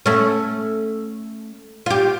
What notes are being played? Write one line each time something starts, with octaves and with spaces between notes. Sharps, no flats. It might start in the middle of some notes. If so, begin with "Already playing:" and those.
A3 C#4
F4 G4